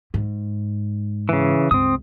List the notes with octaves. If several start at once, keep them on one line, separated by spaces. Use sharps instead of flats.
G#2
C#3 E3
C#2 G2 C4 D#6